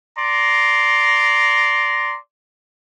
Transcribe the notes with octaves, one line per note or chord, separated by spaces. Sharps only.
D5 A#5 C6